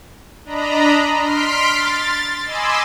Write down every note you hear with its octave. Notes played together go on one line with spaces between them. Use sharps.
D4 D#5 A#5 B5
C6 F6 B6 D7
A6
D#5 G#5 B5 C6 D6 E6